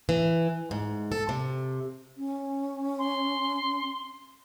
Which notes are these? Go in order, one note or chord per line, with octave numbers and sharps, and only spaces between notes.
E3
G#2
A4
C3
C#4
C6